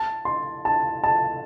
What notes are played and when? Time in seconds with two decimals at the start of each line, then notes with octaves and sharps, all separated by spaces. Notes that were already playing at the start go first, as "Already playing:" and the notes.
Already playing: A5
0.25 C6
0.65 A5
1.04 A5